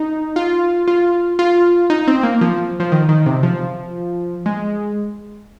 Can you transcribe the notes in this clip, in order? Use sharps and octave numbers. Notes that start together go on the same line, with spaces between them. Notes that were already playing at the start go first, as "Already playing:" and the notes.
Already playing: D#4
F4
F4
F4
D#4
C4
A#3
F3
F3
D#3
D#3
C3
F3
G#3